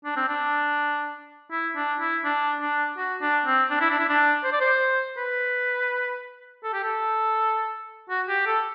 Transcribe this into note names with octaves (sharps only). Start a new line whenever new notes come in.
D4
C4
D4
E4
D4
E4
D4
D4
F#4
D4
C4
D4
E4
D4
E4
D4
C5
D5
C5
B4
A4
G4
A4
F#4
G4
A4